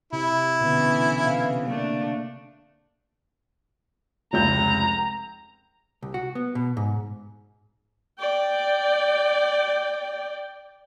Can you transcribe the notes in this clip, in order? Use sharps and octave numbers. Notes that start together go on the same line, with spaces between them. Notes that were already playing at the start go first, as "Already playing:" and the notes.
C3 E4
B2 D3 E3 B3 C#4
C3 F5
A3 A#3 D4 D5
F1 C#2 A#5 G6
C2
F#4
B3
B2
G#2
D5 G5